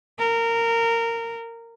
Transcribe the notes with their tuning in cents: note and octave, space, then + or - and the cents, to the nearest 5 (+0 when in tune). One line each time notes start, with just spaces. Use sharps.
A#4 -15